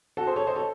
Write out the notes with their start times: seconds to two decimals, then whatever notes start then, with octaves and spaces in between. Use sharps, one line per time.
0.17 F#4 A4
0.27 G#4 C5
0.36 A4 C#5
0.47 C5 D#5
0.56 A4 C#5